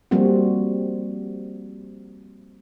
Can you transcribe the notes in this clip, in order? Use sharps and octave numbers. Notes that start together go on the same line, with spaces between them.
F3 G3 A#3 C4 F#4